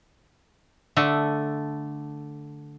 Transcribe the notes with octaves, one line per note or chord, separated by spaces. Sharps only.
D3 A3